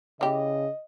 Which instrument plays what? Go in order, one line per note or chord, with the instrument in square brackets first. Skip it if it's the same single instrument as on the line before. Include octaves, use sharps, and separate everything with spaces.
[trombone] C#3 [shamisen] E3 G4 [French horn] D#5